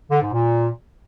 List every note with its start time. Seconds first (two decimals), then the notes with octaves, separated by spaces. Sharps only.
0.11 D3
0.21 G#2
0.32 A#2